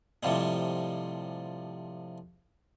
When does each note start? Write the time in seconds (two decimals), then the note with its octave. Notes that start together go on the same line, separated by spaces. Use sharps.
0.23 A2 C3 F3 G3 G#3